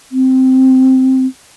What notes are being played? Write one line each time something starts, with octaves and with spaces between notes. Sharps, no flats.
C4